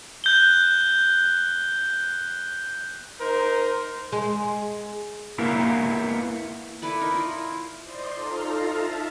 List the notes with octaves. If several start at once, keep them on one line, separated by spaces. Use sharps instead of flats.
F#6 G6 G7
D#4 A#4 C5
G#3
A#3 B3 E4 A#4 B4
E4 A4 B4 D5
D#4 A#4
E4 F4
C5 D5 D#5 C6
D#4 F4 A4 F5 A#5
E5 A5